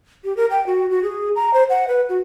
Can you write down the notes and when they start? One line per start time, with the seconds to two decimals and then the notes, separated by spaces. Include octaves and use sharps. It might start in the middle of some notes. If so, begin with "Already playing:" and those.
0.24 G4
0.37 A#4
0.51 G5
0.67 F#4
0.90 F#4
1.03 G#4
1.36 A#5
1.54 C5
1.70 F#5
1.88 B4
2.09 F#4